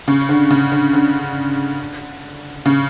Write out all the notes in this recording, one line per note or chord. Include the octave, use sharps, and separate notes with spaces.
C#3
D3
C#3
D3
D3
C#3